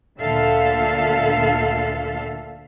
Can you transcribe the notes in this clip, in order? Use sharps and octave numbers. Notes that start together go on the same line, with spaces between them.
D2 A#2 D3 A4 E5 F5